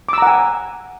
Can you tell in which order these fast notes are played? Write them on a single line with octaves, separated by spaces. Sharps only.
D6 E6 A#5 F#5 G#5